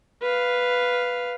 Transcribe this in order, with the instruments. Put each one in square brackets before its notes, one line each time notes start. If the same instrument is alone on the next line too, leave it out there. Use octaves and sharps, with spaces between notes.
[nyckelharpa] B4 F5